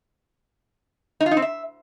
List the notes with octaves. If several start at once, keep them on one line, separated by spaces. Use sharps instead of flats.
D#4
F4
D#4
C4
E5